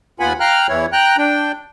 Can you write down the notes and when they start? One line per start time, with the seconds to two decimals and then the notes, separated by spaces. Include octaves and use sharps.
0.20 D#2 B3 F4 F#5 G#5 B5
0.40 F5 G5 A#5 F6 F#6
0.69 E2 E3 E4 C#5
0.92 G5 A#5 F#6
1.18 D4 G5